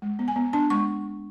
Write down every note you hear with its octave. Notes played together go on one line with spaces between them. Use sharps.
G#3
B3
G#5
B3
D4 A5
G#3 C#6